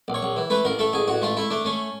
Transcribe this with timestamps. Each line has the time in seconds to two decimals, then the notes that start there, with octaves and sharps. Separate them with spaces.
0.08 A#1
0.14 C#5
0.23 A#1
0.36 E3
0.50 A3 B4
0.65 A1 A#4
0.79 A3 A4
0.93 A1 G#4
1.08 A1 F#4
1.22 A3 F4
1.37 A3 E4
1.50 A3 D4
1.65 A3 C#4